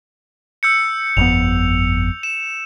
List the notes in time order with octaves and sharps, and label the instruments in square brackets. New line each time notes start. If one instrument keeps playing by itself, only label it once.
[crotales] E6 G6 C#7
[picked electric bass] G1 F2 B3 [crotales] F7
[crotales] E7